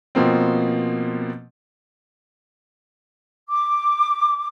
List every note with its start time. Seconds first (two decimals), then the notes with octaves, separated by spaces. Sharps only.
0.15 B2 F3 A#3 C4
3.49 D6